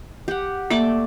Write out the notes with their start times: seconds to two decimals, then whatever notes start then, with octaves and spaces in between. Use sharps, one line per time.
0.28 G4 F#5
0.70 A3 A#3 D5 D6